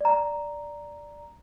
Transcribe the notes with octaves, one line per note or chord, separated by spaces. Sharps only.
D5 A#5